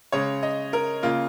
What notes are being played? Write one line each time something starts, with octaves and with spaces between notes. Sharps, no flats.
C#3 G#3 C#5
D#5
A#4
C#3 A#3 F4